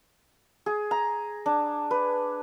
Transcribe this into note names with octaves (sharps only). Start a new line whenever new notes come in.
G#4
A#5
D4
B4